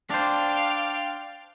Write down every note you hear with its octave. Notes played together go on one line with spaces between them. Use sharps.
D4 C5 F5 G5